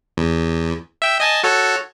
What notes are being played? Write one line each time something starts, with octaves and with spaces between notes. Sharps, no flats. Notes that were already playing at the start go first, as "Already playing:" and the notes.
E2
E5 G5
D#5 G#5 A5
F#4 A4 C#5